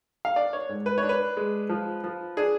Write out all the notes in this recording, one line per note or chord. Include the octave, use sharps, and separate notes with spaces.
F5
D4 D5
C#5
G#2
B4
C#5
D4
B4
G#3
F3
F3
D4 G#4